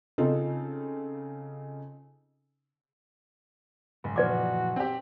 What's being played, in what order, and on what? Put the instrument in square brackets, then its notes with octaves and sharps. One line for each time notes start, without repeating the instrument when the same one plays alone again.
[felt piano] C#3 C4 D#4 F4 A4
[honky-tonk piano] F#1 [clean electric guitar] G#2
[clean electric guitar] A#2 E3 F3 [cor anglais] F#4 [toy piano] B4 D5 D6
[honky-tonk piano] C4 G4